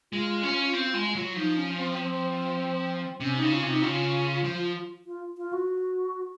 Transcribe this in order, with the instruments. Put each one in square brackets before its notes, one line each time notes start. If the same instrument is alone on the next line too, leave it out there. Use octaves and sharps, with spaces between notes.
[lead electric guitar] G#3 [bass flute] F4
[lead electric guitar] C#4
C4
G#3
F#3
[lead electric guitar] F3 [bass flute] D#4
[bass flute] C#4
C4
C4
[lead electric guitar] C3 [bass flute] C#4
[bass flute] D#4
[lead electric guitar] C#3
[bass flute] F4
[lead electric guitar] C3
[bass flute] D#4
[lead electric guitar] C#3 [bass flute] F4
[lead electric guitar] F3
[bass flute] F4
F4
F#4